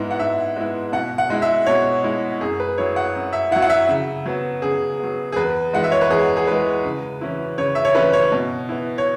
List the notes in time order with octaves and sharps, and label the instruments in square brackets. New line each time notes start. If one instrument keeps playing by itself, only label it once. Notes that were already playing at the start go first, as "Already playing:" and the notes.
Already playing: [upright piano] G#2 G#3 B3 E4
F#5
G#2 E5
G#3 B3 E4
B2 F#5
F#5
G#3 E4
E5
B2 C#5
G#3 E4
F#2 G#4
B4
F#3 E4 C#5
F#5
F#2
E5
E4 F#5
F#3
F#5
E5
C#3
F#3 B3
C#3 G#4
F#3 B3
G#4
E2 B4
E3 G#3 F#5
E5
C#5
B4
E2 G#4
G#4
E3 G#3 B4
C#3
E3 C#4 E4
C#3 C#5
E5
C#5
E3 C#4 E4 B4
C#5
B2
B3 E4
C#5